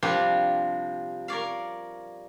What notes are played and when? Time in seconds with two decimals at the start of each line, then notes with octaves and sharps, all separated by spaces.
0.03 C3 F3 G3 C4 D4 F4
1.28 A#4 C#5 D5 F5